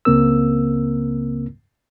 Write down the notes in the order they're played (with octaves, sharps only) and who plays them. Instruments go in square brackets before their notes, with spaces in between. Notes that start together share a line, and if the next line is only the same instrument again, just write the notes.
[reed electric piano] C#2 C#3 A#3 C4 A#4 E6